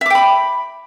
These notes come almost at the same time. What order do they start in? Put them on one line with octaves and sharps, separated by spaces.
E5 D6 G5 B5